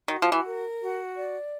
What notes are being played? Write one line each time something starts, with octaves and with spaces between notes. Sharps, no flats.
D#3 F#4
F3
E3
A#4
F#4
D5